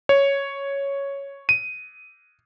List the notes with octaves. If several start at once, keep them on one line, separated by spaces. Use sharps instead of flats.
C#5
D#7